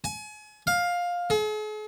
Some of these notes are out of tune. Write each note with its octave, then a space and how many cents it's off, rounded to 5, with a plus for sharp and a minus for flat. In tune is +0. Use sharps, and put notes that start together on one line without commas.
G#5 +35
F5 +10
G#4 +45